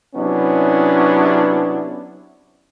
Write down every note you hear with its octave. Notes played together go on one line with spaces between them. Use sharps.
C3 F#3 B3 C#4 D4 E4